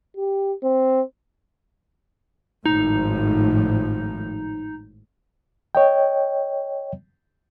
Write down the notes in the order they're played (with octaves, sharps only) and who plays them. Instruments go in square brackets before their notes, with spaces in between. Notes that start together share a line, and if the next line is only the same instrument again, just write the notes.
[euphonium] G4
C4
[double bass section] G#1 A2 F3 [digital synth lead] D#4
[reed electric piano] C#5 D#5 G5